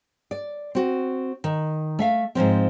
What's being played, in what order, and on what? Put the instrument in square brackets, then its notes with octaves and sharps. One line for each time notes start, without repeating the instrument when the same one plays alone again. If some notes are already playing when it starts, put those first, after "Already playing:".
[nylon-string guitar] D5
C4 F#4
D#3
A3 E5 F5
G#2 C3 F3 C4